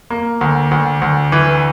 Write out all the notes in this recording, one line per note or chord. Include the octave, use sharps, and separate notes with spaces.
A#3
D2
D2
D2
E3